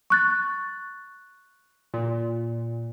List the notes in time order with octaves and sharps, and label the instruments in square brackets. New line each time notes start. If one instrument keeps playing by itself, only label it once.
[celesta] C#6 F#6 A6
[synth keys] A#2